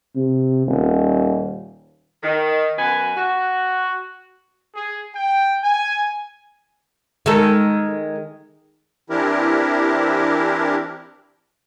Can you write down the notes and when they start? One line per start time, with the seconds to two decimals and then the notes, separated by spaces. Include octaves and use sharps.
0.15 C3
0.67 D#1
2.23 D#3
2.78 F#2 B2 B4 G#5
3.17 F#4
4.75 G#4
5.14 G5
5.64 G#5
7.26 D#3 G#3 A4
9.10 E3 C4 D4 E4 G4 A#4